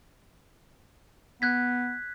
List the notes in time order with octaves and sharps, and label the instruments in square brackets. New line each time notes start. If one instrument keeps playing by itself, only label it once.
[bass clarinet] B3 [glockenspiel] F#6 G#6 B6